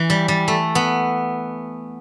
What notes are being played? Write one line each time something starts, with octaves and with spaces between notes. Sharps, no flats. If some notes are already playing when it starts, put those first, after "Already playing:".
Already playing: E3
G3
G3
A3
B3